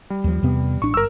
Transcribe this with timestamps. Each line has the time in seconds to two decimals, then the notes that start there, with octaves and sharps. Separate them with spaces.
0.10 G3
0.24 D#2 F3
0.43 E2 C3 B3
0.82 A1 D4 C#6
0.94 G1 A#4 E6